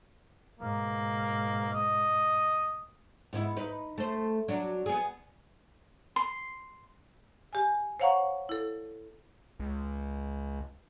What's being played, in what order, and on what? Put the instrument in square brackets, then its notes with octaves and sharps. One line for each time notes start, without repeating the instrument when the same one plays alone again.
[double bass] G#2 B2 [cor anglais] A#3
[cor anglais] D#5
[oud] G#2 B3 E4
D#4 B4
A3 C5
F#3 D4 F#4
B3 G#4
[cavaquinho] C6
[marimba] G4 G#5
C5 C#5 F5 F#5 A#5 C#6
E4 A4
[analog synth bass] C#2